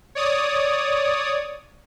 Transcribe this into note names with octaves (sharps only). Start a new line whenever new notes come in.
C#5 D5 D#6